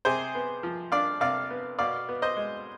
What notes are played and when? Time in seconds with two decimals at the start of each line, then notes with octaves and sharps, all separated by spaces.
0.05 C3 G#4 C5
0.35 B3
0.63 F3
0.92 D4 D5 F5
1.21 C3 D5 F5
1.50 B3
1.79 B2 D5 F5
2.09 B3
2.22 C5 D#5
2.37 G#3